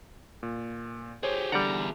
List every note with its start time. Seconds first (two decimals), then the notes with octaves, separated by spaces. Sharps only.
0.43 A#2
1.23 G4 G#4 C5 C#5
1.52 E2 D3 G3 D5 F#5 A#5